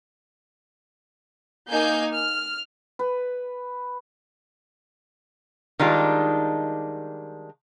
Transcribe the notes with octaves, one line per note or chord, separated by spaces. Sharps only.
A#3 D#4 G#5 G6
F6
B4
D#3 G3 G#3 D4 D#4 F4